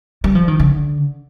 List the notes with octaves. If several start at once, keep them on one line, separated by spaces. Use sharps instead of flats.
G3
F3
D#3
D3